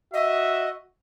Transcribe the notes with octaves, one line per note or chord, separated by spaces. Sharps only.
F#4 D#5 E5